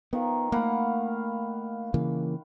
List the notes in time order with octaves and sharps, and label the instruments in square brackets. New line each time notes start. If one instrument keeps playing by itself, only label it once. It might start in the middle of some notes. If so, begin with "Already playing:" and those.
[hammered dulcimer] D#3 F3 [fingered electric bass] B3
[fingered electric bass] A3 A#3 [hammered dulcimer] F5 F#5 B5
[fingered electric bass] C#3 E3 A#3